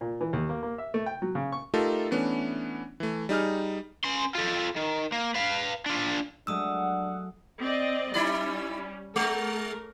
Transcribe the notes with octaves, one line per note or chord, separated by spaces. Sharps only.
A#2
E3
D#2
A#3
A#3
E5
A3
G5
F#3
C#3
C#6
A3 D#4 F4 G4 A4 A#4
E3 A3 B3 C#4 D4
E3 A3
G3 D#4 G#4 F6
C#4 C6
F4 A4
D#3
A#3
B4 F5
D4 F4
F#3 G#3 A3 D4 F#5 D#6 E6
C4 D5 D#5
G3 C#4 D#4 E4 D5
G#3 A3 A#4